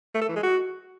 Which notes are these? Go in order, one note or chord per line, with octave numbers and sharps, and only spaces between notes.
A3
A4
E3
G#3
F#4